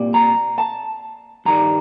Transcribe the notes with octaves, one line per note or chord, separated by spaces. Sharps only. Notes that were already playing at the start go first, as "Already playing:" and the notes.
Already playing: C2 A#2 G3
A#5
A5
G2 D#3 G3 A#5